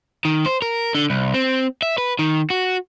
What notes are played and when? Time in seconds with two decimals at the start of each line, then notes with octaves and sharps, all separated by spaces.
0.25 D#3
0.46 C5
0.62 A#4
0.95 D3
1.10 C2
1.34 C4
1.82 E5
1.98 B4
2.19 D#3
2.50 F#4